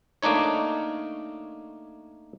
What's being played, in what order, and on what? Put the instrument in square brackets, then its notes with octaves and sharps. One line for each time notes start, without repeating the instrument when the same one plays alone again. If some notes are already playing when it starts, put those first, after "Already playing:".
[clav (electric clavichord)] A3 A#3 D4 D#4 C#5